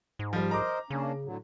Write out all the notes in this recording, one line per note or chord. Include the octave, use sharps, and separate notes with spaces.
G#2
F3 G3
A#4 C5 D#5 A#5 D6
C#3 A#3 C#4 D4
A2 D3 F#3